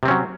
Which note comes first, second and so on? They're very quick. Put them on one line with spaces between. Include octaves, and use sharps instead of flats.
C3 C4 C#4 F#3